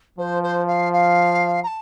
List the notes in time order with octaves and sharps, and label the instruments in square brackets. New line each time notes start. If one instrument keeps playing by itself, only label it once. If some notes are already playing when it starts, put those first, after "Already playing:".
[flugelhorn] F3 [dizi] C5
[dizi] C5
F5
F5
A#5
A5